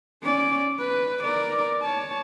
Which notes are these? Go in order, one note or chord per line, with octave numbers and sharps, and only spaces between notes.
C#4 D5
B4
A#4 D5
C#5 A5